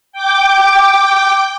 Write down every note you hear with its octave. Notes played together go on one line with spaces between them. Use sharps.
G5 D6